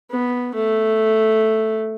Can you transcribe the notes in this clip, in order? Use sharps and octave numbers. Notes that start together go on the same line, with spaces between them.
B3
A3